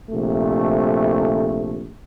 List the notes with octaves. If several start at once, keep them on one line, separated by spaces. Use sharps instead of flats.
A#1 C3 A3